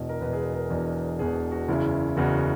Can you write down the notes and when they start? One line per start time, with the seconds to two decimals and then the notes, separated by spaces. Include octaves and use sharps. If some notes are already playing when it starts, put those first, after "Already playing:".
Already playing: E1 E2 B2 D#5
0.09 A#4
0.21 E1 E2 B2 B4
0.33 G#4
0.38 A#4
0.54 A#4
0.70 E1 E2 B2
1.19 E1 E2 B2 G#4
1.35 G#4
1.52 F#4
1.69 F#1 E2 C#3 E4
2.17 F#1 E2 C#3 F#4